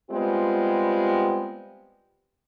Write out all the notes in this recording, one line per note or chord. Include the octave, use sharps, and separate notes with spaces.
G3 G#3 B3 C4 F4 G4